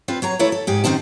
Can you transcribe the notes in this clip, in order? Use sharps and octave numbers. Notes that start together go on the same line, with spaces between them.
C4 F4 B4
F#3 C#5 A#5
E3 A3 E4 A4 C#5
A4
G#2 G4 G#4
F#2 D#3 C4 D#4 A5